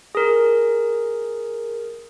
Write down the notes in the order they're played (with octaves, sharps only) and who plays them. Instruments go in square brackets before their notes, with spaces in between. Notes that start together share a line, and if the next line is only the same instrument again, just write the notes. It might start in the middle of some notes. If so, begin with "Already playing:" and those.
[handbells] G#4 A#4